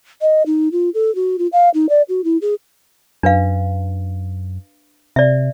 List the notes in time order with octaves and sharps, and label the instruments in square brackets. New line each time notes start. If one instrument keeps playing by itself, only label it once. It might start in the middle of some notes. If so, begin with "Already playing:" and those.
[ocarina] D#5
D#4
F4
A4
F#4
F4
F5
D#4
D5
F#4
E4
G#4
[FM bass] F#2 [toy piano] D4 B4 F5
[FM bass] C3 [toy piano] D5 E5